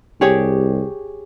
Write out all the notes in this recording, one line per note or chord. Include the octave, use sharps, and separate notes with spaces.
C2 G4 G#4 C#5